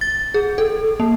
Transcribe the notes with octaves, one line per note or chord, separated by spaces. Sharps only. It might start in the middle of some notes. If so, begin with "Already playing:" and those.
A6
G#4
A4
A#3